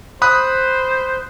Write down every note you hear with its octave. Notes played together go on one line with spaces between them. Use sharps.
C5 B5 D#6 F#6